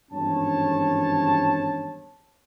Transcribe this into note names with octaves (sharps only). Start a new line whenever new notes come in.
G#1 E2 G2 C#4 C#5 A5